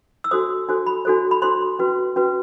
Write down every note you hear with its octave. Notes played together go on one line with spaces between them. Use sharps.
E6
D4 F#4 A4 C5 D#6
D4 F#4 A4 C5
B5
D4 F#4 A4 C5
B5
D4 F#4 A4 C5 C6
C#4 F#4 B4
C#4 F#4 B4